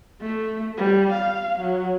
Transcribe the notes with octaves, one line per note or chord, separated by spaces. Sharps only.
A3
G3
F5
F#3